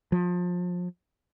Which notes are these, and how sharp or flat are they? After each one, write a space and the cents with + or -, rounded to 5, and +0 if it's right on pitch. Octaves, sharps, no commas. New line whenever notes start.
F3 +30